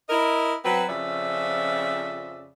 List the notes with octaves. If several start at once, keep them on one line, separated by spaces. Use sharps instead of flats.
E4 A#4 D#5
F#3 C4 B4
F2 C#3 F3 C#4 D5 E5